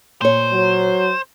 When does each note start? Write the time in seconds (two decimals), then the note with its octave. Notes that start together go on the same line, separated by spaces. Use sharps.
0.21 A#2 C5 C#5
0.53 F#3